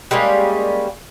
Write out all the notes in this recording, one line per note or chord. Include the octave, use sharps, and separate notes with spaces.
G3 G#3 A#3 C#4